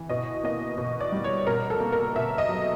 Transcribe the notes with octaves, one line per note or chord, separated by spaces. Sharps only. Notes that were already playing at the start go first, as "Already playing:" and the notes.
Already playing: E3
B2 D#5
A#3 D#5
B2
D5
G3
C#5
B2 A#4
A4
A#3
A#4
B2 E5
D#5
F#3